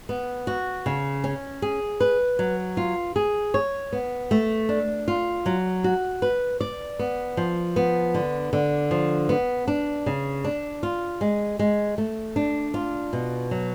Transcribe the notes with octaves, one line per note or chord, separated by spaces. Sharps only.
B3
F#4
C#3
C#4
G#4
B4
F#3
F4
G#4
C#5
B3
A3
D4
F4
F#3
F#4
B4
D5
B3
F3
B3
D3
D3
F3
B3
D4
C#3
D4
F4
G#3
G#3
A3
D4
F4
B2
F#3